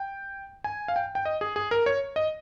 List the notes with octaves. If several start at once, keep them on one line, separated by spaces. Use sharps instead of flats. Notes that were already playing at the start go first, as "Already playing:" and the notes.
Already playing: G5
G#5
F5
G5
G5
D#5
G#4
G#4
A#4
C#5
D#5